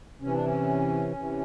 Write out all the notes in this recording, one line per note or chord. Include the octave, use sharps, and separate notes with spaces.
C3 E3 C#4
D4
C#4
C3 E3